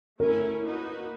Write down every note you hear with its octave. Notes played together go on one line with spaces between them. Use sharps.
A3 C#4 E4 A#4
A#3 D#4 F#4 B4